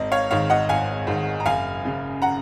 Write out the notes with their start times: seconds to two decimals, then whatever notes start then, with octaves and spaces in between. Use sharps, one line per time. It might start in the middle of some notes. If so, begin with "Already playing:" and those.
Already playing: G#1 D#5
0.12 C#5 F5
0.31 G#2 D#3 C#5 F5
0.50 D#5 F#5
0.69 G#1 F5 G#5
1.07 G#2 D#3
1.40 A#5
1.45 F#1 F5 G#5
1.84 F#2 C#3
2.22 F#5 A#5